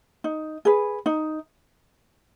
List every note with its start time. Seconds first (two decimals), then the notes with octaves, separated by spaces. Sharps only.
0.24 D#4
0.65 G#4 B4
1.06 D#4